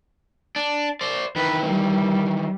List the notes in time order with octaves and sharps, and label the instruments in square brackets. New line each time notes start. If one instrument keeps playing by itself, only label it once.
[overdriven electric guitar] D4
C5 D5
[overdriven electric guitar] D#3 E3 [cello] B4
[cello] G3